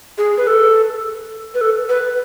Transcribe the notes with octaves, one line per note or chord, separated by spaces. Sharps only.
G#4
B4
A4
B4
A4
B4